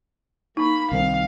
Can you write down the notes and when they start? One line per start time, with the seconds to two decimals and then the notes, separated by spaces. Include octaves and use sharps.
0.57 A#3 D#4 B5
0.92 C2 D#3 C4 F5